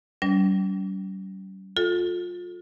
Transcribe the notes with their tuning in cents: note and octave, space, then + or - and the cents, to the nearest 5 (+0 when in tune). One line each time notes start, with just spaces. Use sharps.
G3 -40 C#4 +45
F4 +25 A4 +0